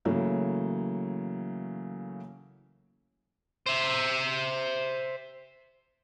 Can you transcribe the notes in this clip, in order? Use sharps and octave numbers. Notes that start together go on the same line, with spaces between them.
C#3 E3 F#3 A3 A#3
C5 E5